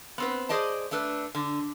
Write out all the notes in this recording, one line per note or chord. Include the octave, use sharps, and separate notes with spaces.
B3 C4 B4
G#4 C5 D5 D#5 A5
A3 D4 A4 B4
D3